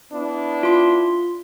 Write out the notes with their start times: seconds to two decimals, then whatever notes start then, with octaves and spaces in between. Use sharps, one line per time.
0.12 B3 D4 E4
0.63 F4 C6